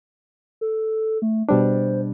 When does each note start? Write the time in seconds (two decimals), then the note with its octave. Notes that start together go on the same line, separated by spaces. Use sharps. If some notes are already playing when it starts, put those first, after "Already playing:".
0.61 A4
1.22 A3
1.49 B2 G3 D4 C5